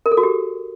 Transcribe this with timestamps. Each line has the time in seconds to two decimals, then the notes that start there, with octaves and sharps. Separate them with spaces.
0.06 A#4
0.11 A4
0.17 F#4
0.23 G4